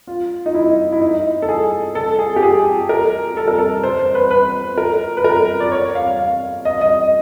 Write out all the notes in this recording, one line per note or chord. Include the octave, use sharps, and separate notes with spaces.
F4
D#4
E4
E4
D#4
A4
G#4
A4
G#4
G4
G#4
A#4
A4
A#4
A4
C5
C5
B4
B4
A#4
B4
A#4
D5
C#5
F5
F5
D#5
D#5